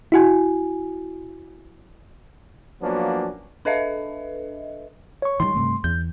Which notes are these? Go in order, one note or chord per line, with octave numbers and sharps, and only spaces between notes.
E4 F#4 G#5
F3 F#3 A#3 B3 C#4 D4
D4 A4 B4 D#5 E5
C#5 C#6
D#3 E3 G3 C6
G2 C3 A3
E2 G6